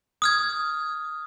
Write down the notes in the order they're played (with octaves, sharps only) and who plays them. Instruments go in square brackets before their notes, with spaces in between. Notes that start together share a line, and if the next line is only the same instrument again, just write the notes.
[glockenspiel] D#6 F6 G#6